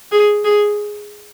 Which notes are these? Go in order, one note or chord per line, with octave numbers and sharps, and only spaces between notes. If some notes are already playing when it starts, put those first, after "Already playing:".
G#4
G#4